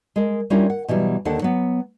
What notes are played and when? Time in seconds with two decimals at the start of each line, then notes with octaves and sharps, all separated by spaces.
0.16 G#3 A#4
0.50 G3 C#4 D4 E4 F4 A#4
0.70 F#5
0.88 B2 E3 F#3 G3
1.25 D#2 D3 D4 A4 F#5
1.42 F#3 B3